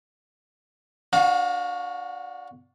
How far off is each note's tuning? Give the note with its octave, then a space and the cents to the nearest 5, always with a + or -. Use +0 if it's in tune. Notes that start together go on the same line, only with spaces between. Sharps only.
D4 +0 F#4 +0 F5 +35